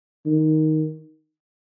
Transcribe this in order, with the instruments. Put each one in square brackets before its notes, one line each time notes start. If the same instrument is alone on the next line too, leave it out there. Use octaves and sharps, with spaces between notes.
[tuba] D#3